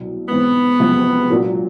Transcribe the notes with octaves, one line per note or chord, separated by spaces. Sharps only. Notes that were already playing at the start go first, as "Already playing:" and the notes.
Already playing: C2 B2 F#3
G#2 E3 G#3 B3 C4
F#1 F2 C3 F3 G#3
A#2 F#3 A#3 D4 F#4